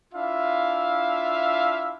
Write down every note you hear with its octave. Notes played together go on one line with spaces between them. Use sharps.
D4 E4 F4 E5 F5